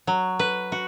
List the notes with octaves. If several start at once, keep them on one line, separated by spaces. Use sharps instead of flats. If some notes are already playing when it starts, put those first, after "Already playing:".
F#3
B4
F#4